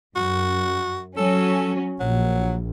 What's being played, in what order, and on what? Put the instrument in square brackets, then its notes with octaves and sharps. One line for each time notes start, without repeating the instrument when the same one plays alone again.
[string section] F#2 [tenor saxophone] F#4
[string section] F#3 C#4 [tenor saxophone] A4
[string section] A#1 [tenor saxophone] F#3